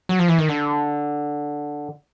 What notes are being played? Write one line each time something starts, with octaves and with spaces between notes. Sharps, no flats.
F#3
F3
E3
D#3
D3